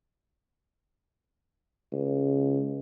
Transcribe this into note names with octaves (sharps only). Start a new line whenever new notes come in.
C#2